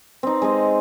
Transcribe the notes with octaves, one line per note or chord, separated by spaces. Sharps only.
C4 D#4
G#3 C4 D#5